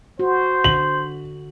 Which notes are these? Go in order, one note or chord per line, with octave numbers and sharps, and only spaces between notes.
F#4 C5
D3 F#7